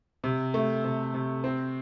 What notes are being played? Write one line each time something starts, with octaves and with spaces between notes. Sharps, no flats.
C3
A3
C3
C3
C4